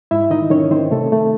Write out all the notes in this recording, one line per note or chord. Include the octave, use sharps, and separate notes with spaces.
G#2 E4 E5
D#3 D#4 D#5
D#3 C#4 C#5
D#3 C4 C5
C3 A3 A4
A3